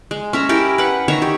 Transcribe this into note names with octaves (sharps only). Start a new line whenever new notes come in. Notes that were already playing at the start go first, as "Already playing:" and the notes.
G#3
C#4 E5 A#5
E4 G4 A#4
B4 F#5
D#3 C#5 E5 A#5
G4